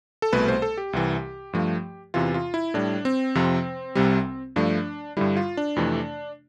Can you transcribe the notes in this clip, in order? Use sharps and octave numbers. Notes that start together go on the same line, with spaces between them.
A4
C2 B2 A3 B4
C5
A4
G4
C2 C3 E3
G2 F3 A3
E2 C3 E3 F4
F4
E4
A2 G3 D4
C4
F2 C3 F3
C2 C3 G3
G2 F3 A3 D4
G2 D3 G3 E4
F4
D4
F2 C3 E3 A3